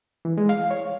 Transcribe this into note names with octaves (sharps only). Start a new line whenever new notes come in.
E3
G#3
F5
C#5